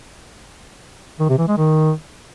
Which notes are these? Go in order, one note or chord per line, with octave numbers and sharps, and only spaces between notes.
D#3
C3
E3
G#3
D#3